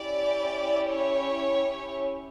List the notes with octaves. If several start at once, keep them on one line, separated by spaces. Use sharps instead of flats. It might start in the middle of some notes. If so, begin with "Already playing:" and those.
Already playing: C#4 E4 G4 D5
C#5